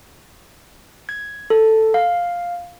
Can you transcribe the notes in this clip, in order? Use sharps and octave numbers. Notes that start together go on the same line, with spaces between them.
G#6
A4
F5